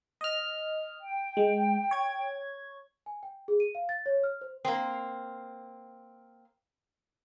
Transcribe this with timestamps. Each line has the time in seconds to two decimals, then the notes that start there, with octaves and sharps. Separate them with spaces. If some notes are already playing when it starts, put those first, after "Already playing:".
0.21 D#5 F6
1.01 G5
1.37 G#3
1.91 C#5 G#6
3.06 G#5
3.23 G5
3.48 G#4
3.60 D#7
3.75 F5
3.89 A6
4.06 C#5
4.24 F6
4.41 C5
4.65 A#3 C4